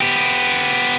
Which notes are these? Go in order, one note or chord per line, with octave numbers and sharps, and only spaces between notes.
B3 G4